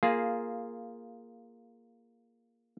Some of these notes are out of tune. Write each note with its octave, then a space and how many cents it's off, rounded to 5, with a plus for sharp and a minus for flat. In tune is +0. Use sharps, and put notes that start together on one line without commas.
A#3 +0 F4 -5 G#4 +0